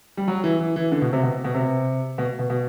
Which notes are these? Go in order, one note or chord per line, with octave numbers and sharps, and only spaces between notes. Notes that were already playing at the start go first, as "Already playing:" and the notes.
G3
F#3
E3
E3
E3
D3
B2
C3
B2
B2
C3
B2
B2
B2